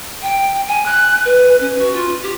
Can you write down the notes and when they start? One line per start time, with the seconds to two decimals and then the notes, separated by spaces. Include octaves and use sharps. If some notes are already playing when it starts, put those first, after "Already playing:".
0.22 G5
0.67 G#5
0.85 F#6
1.25 B4
1.60 C#4
1.78 F#4
1.93 F4
2.22 G4